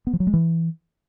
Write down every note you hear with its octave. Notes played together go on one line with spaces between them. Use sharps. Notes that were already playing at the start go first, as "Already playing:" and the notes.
B3
F3
F#3
G#3
E3